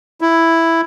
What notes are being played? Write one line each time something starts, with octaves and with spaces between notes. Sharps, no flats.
E4